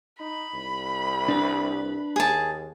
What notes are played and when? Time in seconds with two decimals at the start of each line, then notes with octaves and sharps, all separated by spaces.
0.20 D#4 B5
0.54 C2
1.28 D4 B4
2.16 D#2 G#4 A5